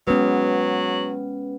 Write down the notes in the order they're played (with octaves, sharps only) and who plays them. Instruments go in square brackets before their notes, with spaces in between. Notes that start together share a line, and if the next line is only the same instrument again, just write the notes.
[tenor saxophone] F#3 [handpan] G#3 B3 [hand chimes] C#4 B4